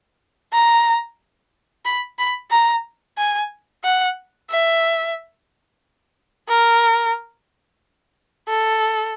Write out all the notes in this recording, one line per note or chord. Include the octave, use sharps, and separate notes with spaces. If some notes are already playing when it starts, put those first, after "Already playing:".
A#5
B5
B5
A#5
G#5
F#5
E5
A#4
A4